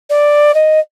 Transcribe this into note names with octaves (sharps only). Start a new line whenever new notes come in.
D5
D#5